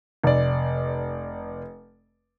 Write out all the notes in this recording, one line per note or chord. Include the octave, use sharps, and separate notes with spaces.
F1 D5